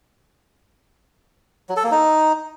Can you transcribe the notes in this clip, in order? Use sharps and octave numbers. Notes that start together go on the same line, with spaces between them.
F#3
A4
A#3
D#4